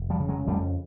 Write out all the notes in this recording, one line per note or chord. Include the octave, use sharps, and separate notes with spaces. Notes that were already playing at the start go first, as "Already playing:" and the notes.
Already playing: F1
F3 G3
C#3
F#3 G#3
F2 G3 A3